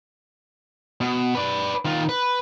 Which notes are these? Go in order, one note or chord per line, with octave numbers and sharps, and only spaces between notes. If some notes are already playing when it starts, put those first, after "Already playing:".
B2
B4 D5
D#3 F4
B4